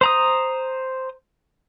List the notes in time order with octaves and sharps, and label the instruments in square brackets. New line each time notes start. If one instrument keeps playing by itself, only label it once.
[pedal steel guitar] C5 A#5 D#6